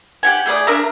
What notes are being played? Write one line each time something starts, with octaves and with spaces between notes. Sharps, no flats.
G4 F#5 G#5
A3 G#4 D5 D#6
D4 A#4 E5 A#5